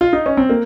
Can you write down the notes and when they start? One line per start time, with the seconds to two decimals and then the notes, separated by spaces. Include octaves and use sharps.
0.01 F4
0.13 D#4
0.26 C#4
0.37 C4
0.50 A#3